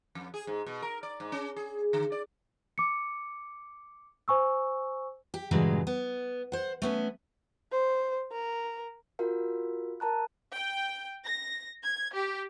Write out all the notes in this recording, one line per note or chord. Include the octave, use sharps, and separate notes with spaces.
F2
G#4
G#2
B2
A#4
D5
G#2
C#4
G#4
D3
D5
D6 C#7
C5 G#5 C#6 E6
G4
G2 A#2 C#3 E3 F#3 G#3
B3
C5 F#5
A3 B3 C#4
C5
A#4
F4 F#4 A#4 F5
A#4 A5 A#5 F#6
G5
A#6
G#6
G4